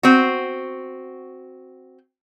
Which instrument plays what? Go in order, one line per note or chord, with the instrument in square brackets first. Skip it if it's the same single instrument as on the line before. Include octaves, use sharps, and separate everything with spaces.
[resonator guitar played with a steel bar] C4 F#4